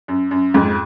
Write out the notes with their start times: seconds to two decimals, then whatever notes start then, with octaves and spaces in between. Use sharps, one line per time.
0.08 F#2
0.31 F#2
0.54 F2 G#2